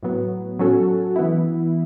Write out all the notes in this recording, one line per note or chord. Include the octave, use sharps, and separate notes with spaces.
A2 F#3 B3
F#3 C#4 F#4 A4
E3 B3 E4